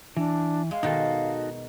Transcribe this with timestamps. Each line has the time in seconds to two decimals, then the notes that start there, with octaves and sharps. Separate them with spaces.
0.17 E3 D4
0.71 G#3 F5
0.83 B2 D#3 D#4 F#4 A4